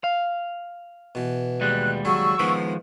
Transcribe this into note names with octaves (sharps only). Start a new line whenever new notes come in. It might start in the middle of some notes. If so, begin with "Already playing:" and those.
F5
B2 E3
D#2 G3 G#3 F#6
C#3 F#3 C#4 C#6 E6
D#3 F3 G#3 B3 B5